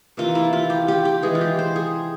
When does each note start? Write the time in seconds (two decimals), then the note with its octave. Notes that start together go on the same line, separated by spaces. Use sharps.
0.17 C3 E3 A#3 F4
0.35 E4
0.53 F4
0.70 G4
0.88 G4
1.05 G4
1.23 E3 G#3 G#4
1.35 F4
1.41 G4
1.59 C5
1.76 G#4